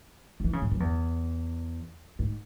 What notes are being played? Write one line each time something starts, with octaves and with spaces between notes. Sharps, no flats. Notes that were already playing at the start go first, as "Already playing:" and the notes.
F#3
E3
C#3
A2
F#2
E2
G#2